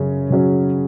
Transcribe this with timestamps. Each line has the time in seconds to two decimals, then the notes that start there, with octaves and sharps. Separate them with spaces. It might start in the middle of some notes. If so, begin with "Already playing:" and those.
Already playing: F#2 C#3 C#4
0.30 C#3 F#3 C#4